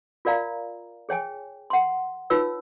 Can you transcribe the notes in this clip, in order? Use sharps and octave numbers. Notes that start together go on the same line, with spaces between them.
F4 A#4 D5 F5 A#5
G#4 C#5 G5 G#5
F#5 C6
D#4 F4 B4 C#5 E6